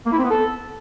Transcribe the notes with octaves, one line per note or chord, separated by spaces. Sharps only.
A#3
E4
C4
B3
A4